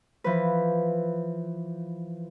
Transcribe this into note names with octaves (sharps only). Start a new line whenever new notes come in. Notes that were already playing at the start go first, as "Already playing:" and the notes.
E3 F3 B4